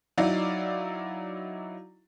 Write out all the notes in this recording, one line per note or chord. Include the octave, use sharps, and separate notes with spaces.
F#3 D#4 E4 D5 F5